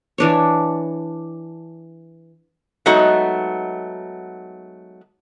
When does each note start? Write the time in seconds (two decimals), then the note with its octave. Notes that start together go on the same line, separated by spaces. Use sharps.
0.18 E3 D4 C#5
2.86 F#3 G#3 A3 B3 D#4 F#4